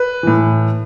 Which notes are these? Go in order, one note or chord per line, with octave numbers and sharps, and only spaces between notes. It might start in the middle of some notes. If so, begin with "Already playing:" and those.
Already playing: B4
A2 E3